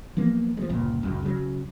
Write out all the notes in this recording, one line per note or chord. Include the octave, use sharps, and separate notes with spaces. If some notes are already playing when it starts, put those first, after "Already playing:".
F3 F#3 A#3 B3
F3 G#3
G1 C#2 A#2
D#1 C#2 F#2
C#3 F#3